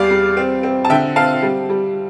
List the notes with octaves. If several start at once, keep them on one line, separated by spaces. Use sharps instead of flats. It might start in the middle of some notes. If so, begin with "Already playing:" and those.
Already playing: E2 G3 D5 F5
G3
C4
C4
A5
D3 E5 G5
C4 F5 A5
G3
G3